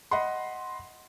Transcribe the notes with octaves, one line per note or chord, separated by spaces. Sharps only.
D#5 F#5 B5 C6